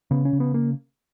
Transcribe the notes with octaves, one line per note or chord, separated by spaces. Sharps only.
C#3 B3
C#4
C#3
B3
A#3